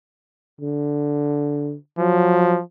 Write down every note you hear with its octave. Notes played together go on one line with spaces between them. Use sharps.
D3
F3 F#3